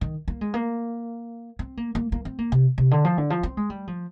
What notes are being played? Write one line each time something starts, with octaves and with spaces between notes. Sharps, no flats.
D#3
A#3
G#3
A#3
C4
A#3
A#3
A#3
C4
A#3
C3
C3
D3
F3
D3
F3
C4
G#3
G3
F3